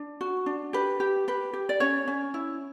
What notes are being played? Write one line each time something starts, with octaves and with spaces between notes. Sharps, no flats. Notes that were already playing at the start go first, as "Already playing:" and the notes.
Already playing: D4
F#4
D4
G4 B4
G4
G4 B4
G4
D5
C#4 C#5
C#4
E4